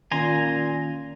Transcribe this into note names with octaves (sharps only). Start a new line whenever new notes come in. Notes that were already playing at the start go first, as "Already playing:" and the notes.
A#2 D#3 C#4 G#5 A#5 C6